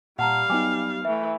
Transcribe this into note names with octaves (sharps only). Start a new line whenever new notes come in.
A#2 G3 F5 F#5 A5 A#5
F#3 B3 D#4 G5 G#5 D6
E3 A3 E5